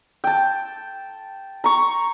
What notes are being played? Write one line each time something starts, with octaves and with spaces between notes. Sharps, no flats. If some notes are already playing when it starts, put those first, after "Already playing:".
G5 A5
A#5 C#6